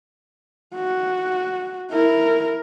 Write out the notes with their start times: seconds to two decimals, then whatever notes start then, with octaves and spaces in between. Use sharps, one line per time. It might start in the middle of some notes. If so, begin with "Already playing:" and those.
0.75 F#4
1.91 E4 A#4